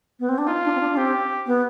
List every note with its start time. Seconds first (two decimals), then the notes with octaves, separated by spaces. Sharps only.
0.20 B3
0.29 C4
0.38 D4
0.47 D#4 F4
0.64 D4
0.76 C4
0.81 D4
0.92 D4
0.97 C4 G4
1.47 B3